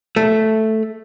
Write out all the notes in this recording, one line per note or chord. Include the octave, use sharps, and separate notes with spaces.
A3